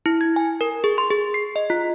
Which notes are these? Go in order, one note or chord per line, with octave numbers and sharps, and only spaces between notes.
E4
G#6
G#5
A#4
G#4
C6
G#4
C7
D#5
F4